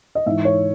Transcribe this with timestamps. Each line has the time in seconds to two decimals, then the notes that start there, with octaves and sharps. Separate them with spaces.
0.15 D#5
0.26 G#2 E3 E5
0.45 C#5